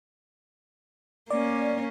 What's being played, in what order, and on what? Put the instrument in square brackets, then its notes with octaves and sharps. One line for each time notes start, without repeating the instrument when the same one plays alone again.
[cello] A#3 C#4 [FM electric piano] D5